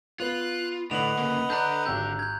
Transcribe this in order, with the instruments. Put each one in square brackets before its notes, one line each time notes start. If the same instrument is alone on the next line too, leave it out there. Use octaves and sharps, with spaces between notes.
[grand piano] B3 B4 [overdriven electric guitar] F4 [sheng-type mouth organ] F#6
[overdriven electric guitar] A2 [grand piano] D3 [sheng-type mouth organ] B4 D#5 F#5 [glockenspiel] F7 F#7
[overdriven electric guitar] C#3 A#3
[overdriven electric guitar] D3 D5 [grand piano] A5 [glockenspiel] A#5 F#6 G6
[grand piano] G#1 G4 E6 [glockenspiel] G6
[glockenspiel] G6 G#6